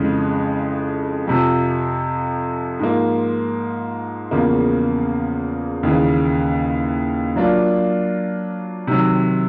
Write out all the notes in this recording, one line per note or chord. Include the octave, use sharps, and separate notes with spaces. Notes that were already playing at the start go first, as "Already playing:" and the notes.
Already playing: F2 C#3 E3 G#3
F2 C3 F3
G#2 F3 A#3
E2 C#3 F3 A#3
D#2 C#3 E3
F#3 A#3 D4 F4
C3 D#3 F#3